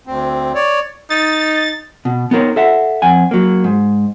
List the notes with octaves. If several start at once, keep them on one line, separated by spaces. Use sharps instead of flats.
D2 C4
C#5 D5
D#4 A6
B2
B3 D#4 A#4 C#5
A4 E5 F#5
F2 F#5 G#5
F#3 A#3
G#2